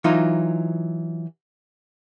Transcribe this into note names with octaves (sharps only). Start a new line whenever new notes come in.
E3 F#3 D#4 F4